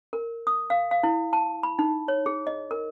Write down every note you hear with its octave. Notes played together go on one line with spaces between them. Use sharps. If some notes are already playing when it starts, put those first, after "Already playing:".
A#4
D#6
F5
F5
E4
A5
B5
D#4
C#5
G#4
D#5
A#4